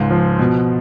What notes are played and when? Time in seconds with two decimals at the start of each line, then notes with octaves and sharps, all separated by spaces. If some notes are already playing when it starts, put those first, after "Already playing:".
Already playing: C#2 G#2
0.10 F3
0.39 B2